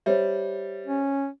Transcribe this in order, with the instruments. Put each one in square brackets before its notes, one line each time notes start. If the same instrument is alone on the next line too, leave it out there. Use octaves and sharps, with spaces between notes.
[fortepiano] G3 [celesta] C5 C#5 E5
[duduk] C#4